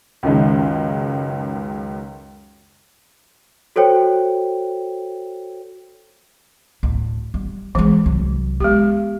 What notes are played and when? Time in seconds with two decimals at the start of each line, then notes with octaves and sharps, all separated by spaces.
0.23 C#2 F#2 D#3 G#3
3.76 F#4 A4 C5 C#5 G5
6.83 D2 A2
7.34 G3
7.75 E3 G#3 A3
8.06 C2 F#3
8.60 G#3 B3 G4